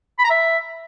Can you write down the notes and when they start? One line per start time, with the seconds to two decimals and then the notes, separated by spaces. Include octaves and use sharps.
0.19 B5
0.24 A#5
0.30 E5